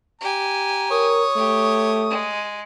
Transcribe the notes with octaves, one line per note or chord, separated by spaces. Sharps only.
G4 G#5 A#5
A#4 C#5 D#6
A3 G4
G#3